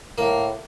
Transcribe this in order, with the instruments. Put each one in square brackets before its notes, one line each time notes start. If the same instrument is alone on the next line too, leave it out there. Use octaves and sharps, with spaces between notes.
[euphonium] A2 [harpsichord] A#3